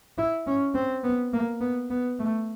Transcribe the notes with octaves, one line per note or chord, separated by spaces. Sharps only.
E4
C#4
C4
B3
A#3
B3
B3
A3